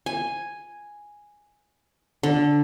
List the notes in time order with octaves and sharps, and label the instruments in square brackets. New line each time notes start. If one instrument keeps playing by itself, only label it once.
[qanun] G#5
D3